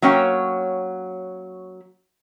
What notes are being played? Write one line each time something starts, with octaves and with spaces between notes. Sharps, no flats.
F#3 A#3 C#4 C#5 G5